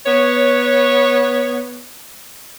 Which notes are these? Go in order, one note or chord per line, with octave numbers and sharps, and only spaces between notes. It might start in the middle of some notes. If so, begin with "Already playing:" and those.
B3 C#5